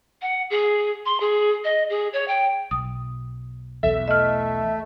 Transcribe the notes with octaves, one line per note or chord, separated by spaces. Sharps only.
F#5
G#4
C6
G#4
D#5
G#4
C#5
G5
B1 D#6
B1 E2 A4 E5
A3 D#5 F6